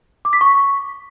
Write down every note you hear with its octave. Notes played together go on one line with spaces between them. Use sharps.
D6
B6
C#6